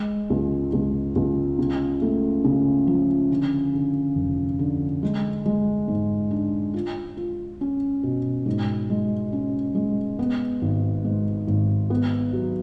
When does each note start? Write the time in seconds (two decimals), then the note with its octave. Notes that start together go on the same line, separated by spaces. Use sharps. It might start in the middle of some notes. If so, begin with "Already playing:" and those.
Already playing: G#3
0.30 C#2
0.73 C#2
1.15 C#2
1.59 C#3
2.02 A3
2.45 C#3
2.87 F3
3.31 D3
3.74 D3
4.16 F1
4.59 D3
5.03 G#3
5.46 G#3
5.88 G#2
6.31 D4
6.74 F4
7.17 F4
7.61 C#4
8.03 B2
8.46 G#2
8.90 G#3
9.33 C#4
9.75 G#3
10.19 B3
10.62 G#1
11.05 G#2
11.47 G#1
11.90 B3
12.33 F#3